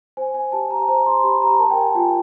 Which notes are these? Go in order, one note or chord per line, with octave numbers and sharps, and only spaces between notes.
C5 G#5
G#5
G4 A5
A#5
C5 A#5
C6
G4 B5
A#5
A#4 A5
G5
G#5
F4 G5